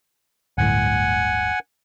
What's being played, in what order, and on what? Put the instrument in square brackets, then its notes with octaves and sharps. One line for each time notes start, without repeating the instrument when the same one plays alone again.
[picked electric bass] D1 G1 A2 [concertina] F#5 G#5